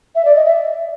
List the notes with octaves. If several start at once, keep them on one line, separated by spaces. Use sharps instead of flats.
E5
D5
D#5
E5